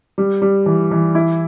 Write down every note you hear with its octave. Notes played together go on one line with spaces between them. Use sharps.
G3
G3
E3
E3
E4